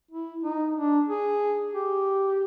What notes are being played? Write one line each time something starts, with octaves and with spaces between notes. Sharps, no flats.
E4
D#4
D4
G#4
G4